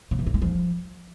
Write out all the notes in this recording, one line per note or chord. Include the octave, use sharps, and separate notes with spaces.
C#3
E3
G2
G#3
F3